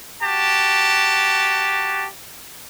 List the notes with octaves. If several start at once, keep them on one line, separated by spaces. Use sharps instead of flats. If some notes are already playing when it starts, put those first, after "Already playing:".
F#4 G4 A5